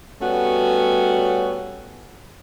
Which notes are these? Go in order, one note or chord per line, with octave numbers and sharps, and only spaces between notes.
G3 A3 B3 C#4 F#4